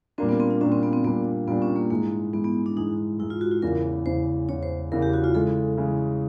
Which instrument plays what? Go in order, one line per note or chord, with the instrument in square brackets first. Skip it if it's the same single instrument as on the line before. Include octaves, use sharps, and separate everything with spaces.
[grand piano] A#2 G3 A#3 D4 [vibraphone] C4
[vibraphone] B3
C4
D4
[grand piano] A#2 G3 A#3 D4 [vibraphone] C#4
[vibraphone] C4
B3
C4
[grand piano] A#2 G3 A#3 D4 [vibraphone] B3
[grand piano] A#2 G3 A#3 D4 [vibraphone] B3
[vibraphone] C#4
A#3
[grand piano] G#2 E3 G#3 [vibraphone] A#3
[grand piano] G#2 E3 G#3 [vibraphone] B3
[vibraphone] B3
D4
[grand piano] G#2 E3 G#3 [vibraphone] D#4
[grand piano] G#2 E3 G#3 [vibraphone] E4
[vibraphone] F4
F#4
F4
[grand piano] E2 C#3 E3 [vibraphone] A#4
[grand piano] E2 C#3 E3 [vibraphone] C5
[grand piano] E2 C#3 E3 [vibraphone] C#5
[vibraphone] C5
[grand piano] E2 C#3 E3 [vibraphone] A#4
[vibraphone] G4
F#4
F4
[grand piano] C#3 E3 G#3 [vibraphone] A4
[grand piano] C#3 E3 G#3